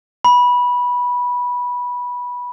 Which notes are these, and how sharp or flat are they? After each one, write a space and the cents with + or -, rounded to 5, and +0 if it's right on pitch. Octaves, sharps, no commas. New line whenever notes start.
B5 -15